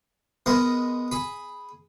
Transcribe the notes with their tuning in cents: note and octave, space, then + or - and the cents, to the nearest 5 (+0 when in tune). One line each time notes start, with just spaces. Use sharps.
G#3 +0 B3 +5 A#4 -5
G#4 +0 B5 +0